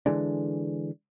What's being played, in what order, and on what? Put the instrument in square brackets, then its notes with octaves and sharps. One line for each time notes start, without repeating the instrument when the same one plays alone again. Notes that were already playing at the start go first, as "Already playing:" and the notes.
[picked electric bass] D3 E3 G#3 D4